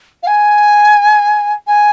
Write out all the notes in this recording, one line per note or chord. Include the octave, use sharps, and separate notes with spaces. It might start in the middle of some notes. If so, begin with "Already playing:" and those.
F5
G#5
G#5